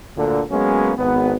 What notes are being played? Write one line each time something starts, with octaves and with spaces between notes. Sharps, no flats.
D2 A#2 D3
F#3 G#3 A#3 B3 C#4
G#1 B3